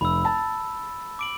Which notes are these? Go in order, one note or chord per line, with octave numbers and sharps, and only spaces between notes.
F1 B5 E6
A5
D6 D7 F#7